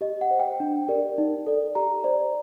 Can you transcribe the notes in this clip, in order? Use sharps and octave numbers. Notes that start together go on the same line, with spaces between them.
G4 D#5
F#5
C5
G5
D4
G4 A#4 D5
D#4
A4 D5
G4 A#5
C5 D5